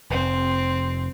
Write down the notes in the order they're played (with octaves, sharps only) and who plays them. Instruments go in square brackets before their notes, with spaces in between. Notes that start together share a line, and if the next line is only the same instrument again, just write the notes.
[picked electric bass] F1 [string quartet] C4